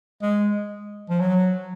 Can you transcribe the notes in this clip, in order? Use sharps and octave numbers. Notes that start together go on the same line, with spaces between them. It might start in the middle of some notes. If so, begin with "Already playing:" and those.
G#3
F3
F#3